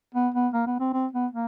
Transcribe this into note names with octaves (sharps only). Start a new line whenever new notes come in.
B3
B3
A#3
B3
C4
C4
B3
A#3